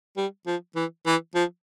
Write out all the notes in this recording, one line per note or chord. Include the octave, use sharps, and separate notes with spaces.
G3
F3
E3
E3
F3